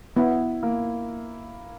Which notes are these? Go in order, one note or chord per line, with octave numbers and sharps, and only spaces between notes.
B3 E4
A#3